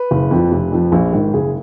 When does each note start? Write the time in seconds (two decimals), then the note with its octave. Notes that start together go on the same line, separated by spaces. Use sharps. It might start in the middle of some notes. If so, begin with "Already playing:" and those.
Already playing: B4
0.11 F#1
0.31 F2
0.36 F3
0.52 F1
0.72 F2 F3
0.92 A#1
1.13 G#2 D#3
1.34 F#1 G#4